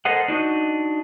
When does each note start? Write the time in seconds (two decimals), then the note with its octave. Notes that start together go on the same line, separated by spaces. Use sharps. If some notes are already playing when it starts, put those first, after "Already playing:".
0.05 A4 A#4 C5 D#5 F#5
0.28 D4 D#4 F#4 D#5